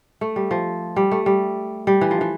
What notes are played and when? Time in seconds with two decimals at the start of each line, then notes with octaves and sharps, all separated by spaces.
0.21 A3
0.36 G3
0.51 F3
0.96 G3
1.11 A3
1.26 G3
1.87 G3
2.01 E3
2.11 F3
2.21 E3